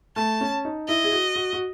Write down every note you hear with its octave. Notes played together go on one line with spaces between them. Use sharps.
A3 A5
C#4
D#4
E4 D#5
G#4
F#4
F#4
F#4